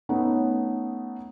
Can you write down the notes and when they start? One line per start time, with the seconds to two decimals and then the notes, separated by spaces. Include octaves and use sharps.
0.09 A3 B3 C#4 D#4